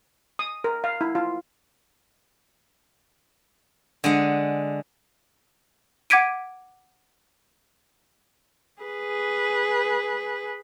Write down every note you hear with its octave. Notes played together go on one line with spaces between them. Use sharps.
D#6
A#4
F5
E4
F4
D3 G#3 F#5
F#5 D6 G#6 B6 D7 D#7
G#4 B4